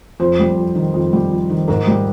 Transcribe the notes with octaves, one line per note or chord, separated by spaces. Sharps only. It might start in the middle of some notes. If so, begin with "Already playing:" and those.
F2 C5
G3
F2
D#3
F2
G3
F2
D#3
G#2 A#4
G3